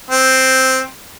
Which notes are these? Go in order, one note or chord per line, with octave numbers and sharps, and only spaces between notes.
C4